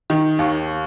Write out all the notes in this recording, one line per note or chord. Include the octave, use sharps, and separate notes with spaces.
D#3
D#2